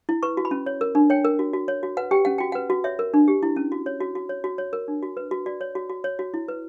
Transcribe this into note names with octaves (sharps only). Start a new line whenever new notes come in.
E4
B4 C#6
F#4
B5
C#4
C#5
A#4
D4
C#5 G5
A#4
F#4
F#4
C#5
F#4
B4 F#5
G4 G5
C#4 F#5
F#4 G5
B4 F#5
F#4
C#5 E5
A#4
D4
G4
E4
C#4
F#4
C#5
F#4
F#4
C#5
F#4
C#5
A#4
D4
F#4
B4
F#4
F#4 D5
C#5
F#4
F#4
C#5
F#4
E4
B4